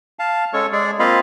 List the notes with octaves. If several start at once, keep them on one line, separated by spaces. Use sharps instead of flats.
F5 A5
G#3 C#4 A4 C#5 C#6
G#3 G#4 D5
A#3 C4 F4 D#5 F5 B5